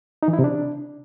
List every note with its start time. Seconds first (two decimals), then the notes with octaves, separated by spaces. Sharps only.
0.23 D#4
0.28 E3
0.33 E4
0.39 C3
0.44 D4